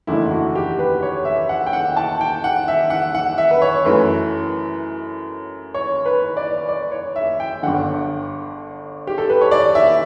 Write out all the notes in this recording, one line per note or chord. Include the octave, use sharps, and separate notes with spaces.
F#1 E2 D3 A3 E4
F#4
G4
B4
C#5
E5
F#5
G5
F#5
A5
G5
F#5
E5
F#5
F#5
E5
B4
C#5
F#2 E3 A3 B4
C#5
B4
D5
D5
C#5
E5
G5
G1 G2 D3 F#5
G4
A4
B4
C#5
D5
E5